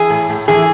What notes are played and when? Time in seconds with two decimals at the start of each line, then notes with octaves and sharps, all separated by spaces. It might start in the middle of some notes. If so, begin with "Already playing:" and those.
Already playing: E3 G#4
0.10 A2
0.30 A2
0.48 E3 G#4